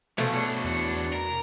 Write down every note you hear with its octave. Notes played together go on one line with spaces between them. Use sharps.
B2 F3 A3 G#4 A4 C5
D4 C#5
E2
A#4